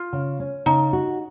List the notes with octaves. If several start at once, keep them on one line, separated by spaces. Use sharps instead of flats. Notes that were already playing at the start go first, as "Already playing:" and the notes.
Already playing: F4
C#3
C#4
C#3 D#4
F#4